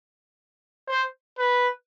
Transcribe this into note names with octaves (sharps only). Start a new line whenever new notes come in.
C5
B4